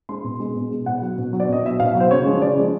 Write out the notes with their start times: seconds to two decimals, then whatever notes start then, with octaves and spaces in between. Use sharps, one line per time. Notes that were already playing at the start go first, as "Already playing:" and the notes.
0.09 G#3 C6
0.24 B2
0.40 G#3
0.56 B2
0.71 G#3
0.86 B2 F#5
1.02 F#3
1.18 B2
1.33 F#3
1.40 D5
1.49 B2 D#5
1.64 F#3 E5
1.80 B2 F5
1.95 F#3
2.00 C5
2.11 C#3 C#5
2.26 F3 G#3
2.42 C#3 D5
2.57 F3 G#3